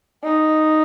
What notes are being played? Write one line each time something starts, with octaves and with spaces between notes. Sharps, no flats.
D#4